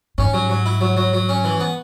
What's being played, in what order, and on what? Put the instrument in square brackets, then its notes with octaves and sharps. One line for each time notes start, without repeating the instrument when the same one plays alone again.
[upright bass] G#2 [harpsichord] C#4
[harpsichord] F#3
F#3
E4
F#3
F#3
F#3
C#4
E3
B3